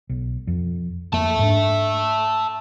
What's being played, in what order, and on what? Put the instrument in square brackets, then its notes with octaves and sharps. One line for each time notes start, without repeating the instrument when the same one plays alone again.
[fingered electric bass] B1
F2
[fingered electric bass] F2 A#3 [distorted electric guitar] E5 A5
[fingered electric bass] G#2 D4